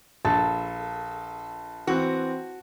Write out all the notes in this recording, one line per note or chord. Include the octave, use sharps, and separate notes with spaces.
A#1 A4 A5 A6
E3 C4 F#4